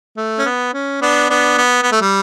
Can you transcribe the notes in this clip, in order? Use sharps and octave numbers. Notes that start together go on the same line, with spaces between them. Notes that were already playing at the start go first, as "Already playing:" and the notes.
A3
C#4
B3
C#4
B3 D4
B3 D4
B3
B3
A3
G3